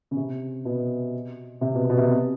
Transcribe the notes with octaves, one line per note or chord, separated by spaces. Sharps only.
C#3
C3
B2
C3
B2
B2
C3